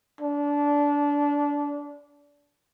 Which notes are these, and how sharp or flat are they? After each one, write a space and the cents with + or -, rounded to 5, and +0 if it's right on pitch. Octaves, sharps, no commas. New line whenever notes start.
D4 -20